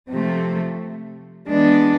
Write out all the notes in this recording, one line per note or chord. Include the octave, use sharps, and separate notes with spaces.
C3 F3 A3
E3 G#3 B3 D4